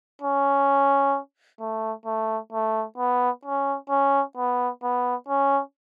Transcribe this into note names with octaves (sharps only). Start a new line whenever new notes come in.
C#4
A3
A3
A3
B3
C#4
C#4
B3
B3
C#4